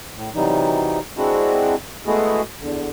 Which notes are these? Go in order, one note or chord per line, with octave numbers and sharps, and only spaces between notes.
A2
C3 E3 F#3 G3 D#4
G#3 C4 D4 E4 F#4
G#3 A3 B3 E4 F#4 G#4
E2 D3